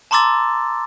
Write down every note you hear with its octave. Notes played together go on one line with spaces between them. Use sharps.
A5 A#5 C6 D6 E6 A6